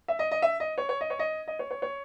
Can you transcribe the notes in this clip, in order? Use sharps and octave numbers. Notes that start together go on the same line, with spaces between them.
E5
D#5
D#5
E5
D#5
C#5
C#5
D#5
C#5
D#5
D#5
C#5
C#5
C#5